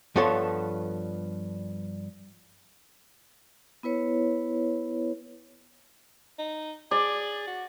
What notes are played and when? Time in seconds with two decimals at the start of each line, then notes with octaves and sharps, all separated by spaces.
0.16 G2 F3 B3 A4 C#5 C6
3.83 B3 E4 B4 C#5
6.39 D#4
6.91 G#4 D5
7.47 F#4